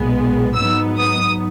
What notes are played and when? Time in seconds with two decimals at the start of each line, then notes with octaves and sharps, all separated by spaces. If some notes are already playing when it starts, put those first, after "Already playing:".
Already playing: B1 A#2 G#3 B3
0.55 G#2 F#3 B3 D#4 E6
0.98 D#6